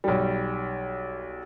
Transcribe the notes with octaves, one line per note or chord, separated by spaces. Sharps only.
B1 G3